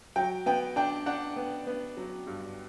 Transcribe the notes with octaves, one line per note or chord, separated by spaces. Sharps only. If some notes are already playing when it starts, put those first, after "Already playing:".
F#3 G5
B3 G5
D4 G5
D4 F#5
B3
B3
F#3
G2